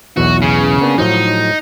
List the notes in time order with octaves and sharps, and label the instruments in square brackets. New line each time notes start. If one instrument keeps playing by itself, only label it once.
[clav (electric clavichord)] B1 E2 E3 [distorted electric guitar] F#4
[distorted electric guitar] C#3
[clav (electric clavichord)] A#3 B3 D4
[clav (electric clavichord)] A2 F3 F#3 [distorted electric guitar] D#4